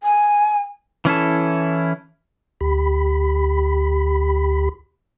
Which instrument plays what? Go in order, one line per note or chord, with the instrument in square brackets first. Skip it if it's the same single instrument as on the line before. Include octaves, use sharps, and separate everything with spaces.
[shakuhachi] G#5
[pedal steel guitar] E3 C#4 E4 A4
[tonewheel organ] D2 G4 B5